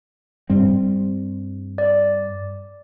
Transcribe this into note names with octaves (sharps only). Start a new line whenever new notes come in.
G2 G3 C4
D5